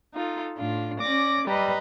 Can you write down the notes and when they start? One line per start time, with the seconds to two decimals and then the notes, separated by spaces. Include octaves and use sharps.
0.13 D#4 F4 A4
0.57 A2 D4 F4
1.00 C#4 D5 D6 A#6
1.47 G3 B4 D#5 A#5